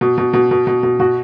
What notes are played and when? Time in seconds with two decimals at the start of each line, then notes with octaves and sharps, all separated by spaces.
0.01 B2
0.18 B2
0.34 B2
0.51 B2
0.67 B2
0.83 B2
1.00 B2 F#4